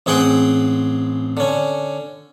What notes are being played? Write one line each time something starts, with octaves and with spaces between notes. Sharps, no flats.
A1 C4 G#4 F#5 G5
D3 C#4